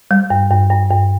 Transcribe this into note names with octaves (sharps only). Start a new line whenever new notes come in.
G3
G2
G2
G2
G2